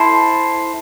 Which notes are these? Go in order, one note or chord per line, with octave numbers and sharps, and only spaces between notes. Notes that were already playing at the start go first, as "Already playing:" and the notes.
Already playing: E4 A4 C5